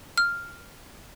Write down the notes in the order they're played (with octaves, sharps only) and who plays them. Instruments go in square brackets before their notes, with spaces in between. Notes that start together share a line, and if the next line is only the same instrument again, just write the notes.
[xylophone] F6